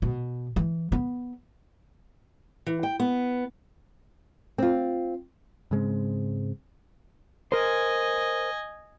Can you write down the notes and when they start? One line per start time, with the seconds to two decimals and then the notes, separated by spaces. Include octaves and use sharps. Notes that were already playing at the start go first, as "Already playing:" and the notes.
0.02 B2
0.56 E3
0.92 B3
2.66 E3
2.83 G5
3.00 B3
4.58 C4 F4
5.71 G#2 C#3 G#3 C4
7.52 A#4 C5 D#5 G#5